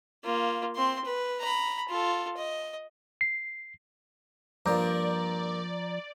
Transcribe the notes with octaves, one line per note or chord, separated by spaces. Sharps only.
A#3 F4
C4 C6
B4
A#5 B5
F4 A4
D#5
C7
G2 F3 A#3 D5 A#5 D6 G6